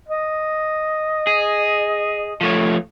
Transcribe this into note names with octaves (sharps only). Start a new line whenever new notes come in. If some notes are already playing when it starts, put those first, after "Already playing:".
D#5
G#4
F3 A3 C#5